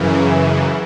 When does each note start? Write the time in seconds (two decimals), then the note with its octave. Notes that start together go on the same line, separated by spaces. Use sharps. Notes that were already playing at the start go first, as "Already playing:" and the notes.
Already playing: F#2 C#3 E3
0.20 E5
0.50 F#5